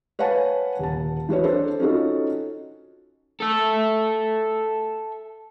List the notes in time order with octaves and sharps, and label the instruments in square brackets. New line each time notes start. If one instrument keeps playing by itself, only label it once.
[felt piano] B4 C#5 F5 F#5 G#5 A5
D#1 A5
E3 F#4 B4 C#5
D4 A4 C5
C#4 D#4 F4 F#4 A4
[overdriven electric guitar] A4 E5